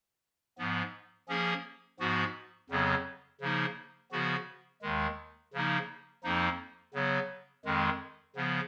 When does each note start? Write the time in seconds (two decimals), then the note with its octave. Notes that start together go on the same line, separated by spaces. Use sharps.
0.58 G#2 F3 B3
1.28 F3 A#3 C#4 G#4
2.00 G#2 F3 B3 F#4
2.70 F2 C#3 F#3 B3
3.41 C#3 F3 A#3 D#4
4.12 C#3 F3 B3 F#4
4.82 D#2 D#3 G#3
5.54 C#3 F3 A#3 D#4
6.24 F2 F3 A#3 D#4
6.94 C#3 F#3 B3
7.65 F2 D#3 G#3
8.36 C#3 F3 B3